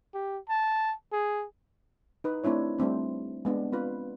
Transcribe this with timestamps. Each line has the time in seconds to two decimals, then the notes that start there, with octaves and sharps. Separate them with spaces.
0.14 G4
0.49 A5
1.13 G#4
2.24 D#4 B4
2.44 A3 C4 D4 E4 C#5
2.78 G3 A3 C4 D4
3.45 G#3 B3 D4
3.72 C4 F4 B4